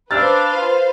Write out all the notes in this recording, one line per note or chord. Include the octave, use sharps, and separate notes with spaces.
D4 B4 C5 F5 E6 F6 A6
F4